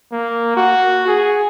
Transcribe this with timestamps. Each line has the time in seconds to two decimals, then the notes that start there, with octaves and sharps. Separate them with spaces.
0.12 A#3
0.57 F#4
1.08 G#4